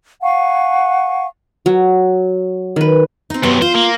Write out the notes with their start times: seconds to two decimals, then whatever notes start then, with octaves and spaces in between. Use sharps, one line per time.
0.21 F5 F#5 G#5 C#6
1.66 F#3
2.76 D#3 B4
3.30 C4 D#4
3.43 G2 C3 F#3 B3 C5
3.62 F4 C5
3.75 A#3